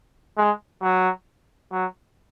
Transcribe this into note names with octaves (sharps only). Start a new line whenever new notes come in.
G#3
F#3
F#3